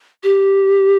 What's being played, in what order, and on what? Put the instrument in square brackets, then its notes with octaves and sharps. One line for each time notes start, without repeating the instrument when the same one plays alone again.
[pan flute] G4